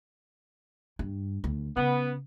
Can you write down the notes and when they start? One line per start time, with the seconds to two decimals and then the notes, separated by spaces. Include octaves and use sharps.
0.99 G2
1.44 D2
1.77 C#3 B3